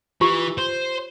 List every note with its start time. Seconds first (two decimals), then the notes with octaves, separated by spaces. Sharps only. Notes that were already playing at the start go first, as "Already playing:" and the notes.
0.21 E3 F4 G4
0.58 C5